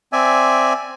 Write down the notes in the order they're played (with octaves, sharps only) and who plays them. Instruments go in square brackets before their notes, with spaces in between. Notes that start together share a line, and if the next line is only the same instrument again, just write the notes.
[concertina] C4 D5 E5 G#5